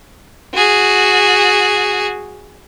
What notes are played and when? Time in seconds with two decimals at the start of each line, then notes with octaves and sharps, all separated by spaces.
0.54 F#4 G#4